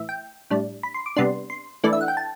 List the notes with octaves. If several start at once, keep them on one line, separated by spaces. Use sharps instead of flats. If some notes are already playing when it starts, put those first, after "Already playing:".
Already playing: A2 E3 E5
G5
A2 G3 D4
B5
C6
D6
C3 G3 B3 D4 C6
C6
E3 A3 D4 D5
E5
F#5
G5
A5